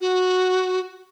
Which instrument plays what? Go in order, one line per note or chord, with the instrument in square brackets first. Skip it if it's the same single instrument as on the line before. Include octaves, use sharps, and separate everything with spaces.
[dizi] F#4